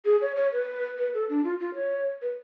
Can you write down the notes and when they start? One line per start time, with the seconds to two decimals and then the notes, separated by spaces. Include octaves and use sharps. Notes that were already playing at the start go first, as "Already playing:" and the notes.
0.05 G#4
0.21 C#5
0.36 C#5
0.52 B4
0.98 B4
1.14 A4
1.29 D4
1.44 F4
1.60 F4
1.75 C#5
2.22 B4